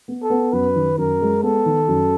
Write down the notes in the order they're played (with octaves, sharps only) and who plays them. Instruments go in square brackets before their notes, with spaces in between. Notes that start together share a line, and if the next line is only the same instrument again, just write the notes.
[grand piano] B3
[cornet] A4
[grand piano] B3
[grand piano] F#2 [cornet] B4
[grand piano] D#3
[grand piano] F#2 [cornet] A#4
[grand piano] G#3
[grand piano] B3 [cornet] A4
[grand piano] D#3
F#2